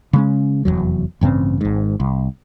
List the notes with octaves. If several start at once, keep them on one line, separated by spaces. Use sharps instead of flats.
C#3 G#3 C#4
F1 B1 E2 F#3
A1 G2 C#3 C4
G#1 G#2
C2